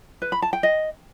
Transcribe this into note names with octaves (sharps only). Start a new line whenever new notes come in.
B4
B5
A5
G5
D#5